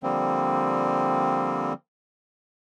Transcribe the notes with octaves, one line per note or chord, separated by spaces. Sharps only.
D3 F3 G3 A#3 C4